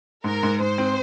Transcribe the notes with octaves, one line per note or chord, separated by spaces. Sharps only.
G#2 A#4
G#2
G#2 C5
C4